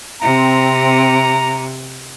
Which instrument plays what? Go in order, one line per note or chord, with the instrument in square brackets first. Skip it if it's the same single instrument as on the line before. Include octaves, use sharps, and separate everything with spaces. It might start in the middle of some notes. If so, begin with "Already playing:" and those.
[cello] C3 [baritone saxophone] C4 [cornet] A#5